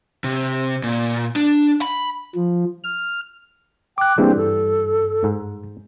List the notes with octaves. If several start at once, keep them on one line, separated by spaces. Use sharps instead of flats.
C3
A#2
D4
B5
F3
F6
G5 D6 F#6
E3 G3 A#3 C4 D4 G#4
G2 A4
G#2